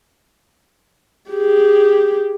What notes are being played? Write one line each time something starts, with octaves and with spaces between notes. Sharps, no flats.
G4 G#4